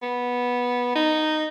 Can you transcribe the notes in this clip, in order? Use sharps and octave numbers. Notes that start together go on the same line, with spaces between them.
B3
D#4